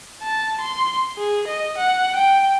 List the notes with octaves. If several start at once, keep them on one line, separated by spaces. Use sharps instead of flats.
A5
C6
G#4
D#5
F#5
G5